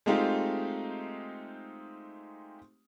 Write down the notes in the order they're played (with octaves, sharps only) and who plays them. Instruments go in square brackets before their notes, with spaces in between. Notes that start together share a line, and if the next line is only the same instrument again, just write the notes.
[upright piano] G#3 A3 C4 D#4 F4 G4